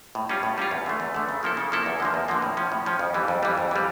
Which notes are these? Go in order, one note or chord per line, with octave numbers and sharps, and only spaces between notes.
A2
G3 C#4 F4
A2
G3 C#4 F4
E2
D3 A3
E2
D3 A3
C#3
F3 A#3 E4 A4
C#3
F3 A#3 E4 A4
E2
D3 F3 A#3
E2
D3 F3 A#3
A2
F3 C#4
A2
F3 C#4
F2
E3 G3
F2
E3 G3
F2
E3 G3